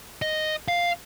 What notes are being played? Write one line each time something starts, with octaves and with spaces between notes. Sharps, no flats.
D#5
F5